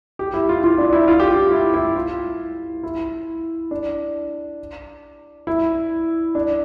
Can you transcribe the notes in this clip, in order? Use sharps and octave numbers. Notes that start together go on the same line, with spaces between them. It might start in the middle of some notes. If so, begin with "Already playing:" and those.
G4
E4
F4
F4
D4
E4
F4
G4
F4
E4
E4
F4
E4
D4
E4
D4